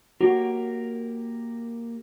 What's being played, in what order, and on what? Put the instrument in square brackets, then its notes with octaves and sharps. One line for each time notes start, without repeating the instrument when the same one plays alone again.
[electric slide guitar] A#3 G4 A#4 [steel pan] F#4